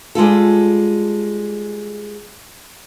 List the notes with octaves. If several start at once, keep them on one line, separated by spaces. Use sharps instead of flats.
G3 G#3 F4 A4